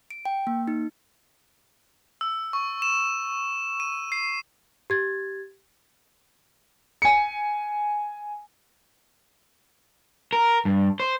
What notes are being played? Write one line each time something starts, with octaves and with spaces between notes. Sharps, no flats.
D7
G5
A#3
D#4
E6
C#6
E7
D#7
C7
G4 G#6 A6
G#5 C#7
A#4
G2
C5